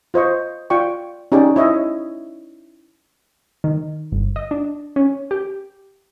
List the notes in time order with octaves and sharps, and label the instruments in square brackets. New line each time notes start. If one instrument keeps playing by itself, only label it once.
[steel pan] F4 C5 D#5 C#6
F4 D5 G5 C#6
C#4 D#4 G4 G#4 D5
E4 C#5 D#5 E5
[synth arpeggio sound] D#3
G1
D#5
D4
C#4
G4